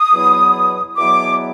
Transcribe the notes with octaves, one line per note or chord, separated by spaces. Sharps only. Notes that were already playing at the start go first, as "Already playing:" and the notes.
Already playing: D#6
E2 B2 F#3 B3 E4
E2 B2 F#3 B3 E4 D6